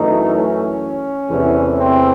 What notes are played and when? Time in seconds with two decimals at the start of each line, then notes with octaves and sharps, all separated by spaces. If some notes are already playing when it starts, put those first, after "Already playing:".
Already playing: F#2 E3 A3 D#4
0.33 C#4
1.29 E2 C3 E3 A3
1.78 C4